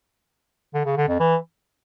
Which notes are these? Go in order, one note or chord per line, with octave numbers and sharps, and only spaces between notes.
D3
C#3
D3
F2
E3